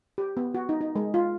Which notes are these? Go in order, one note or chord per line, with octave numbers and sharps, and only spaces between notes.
G4
B3
F#4
D#4
D#4
G#3
F4